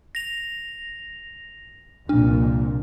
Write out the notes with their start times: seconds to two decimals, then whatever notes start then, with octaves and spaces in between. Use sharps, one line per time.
0.15 A#6 F7
2.09 C2 F2 A#2 D4